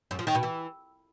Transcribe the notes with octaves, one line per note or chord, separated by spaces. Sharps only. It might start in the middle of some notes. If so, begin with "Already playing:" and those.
F#2
F3
D#3
B2
E3